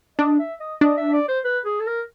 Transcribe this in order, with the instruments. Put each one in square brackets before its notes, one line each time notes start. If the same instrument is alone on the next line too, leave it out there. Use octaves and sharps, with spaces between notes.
[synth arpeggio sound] D4 [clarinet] D#5
[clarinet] E5
D#5
[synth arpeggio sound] D4 [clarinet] D#5
[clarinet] E5
D5
C5
B4
G#4
A4
A#4